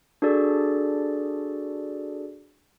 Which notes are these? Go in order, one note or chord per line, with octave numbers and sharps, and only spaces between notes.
D4 F#4 G#4 A4 D5